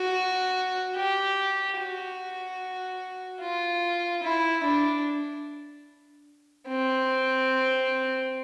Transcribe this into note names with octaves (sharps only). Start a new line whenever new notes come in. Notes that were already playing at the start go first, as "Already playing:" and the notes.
Already playing: F#4
G4
F#4
F4
E4
D4
C4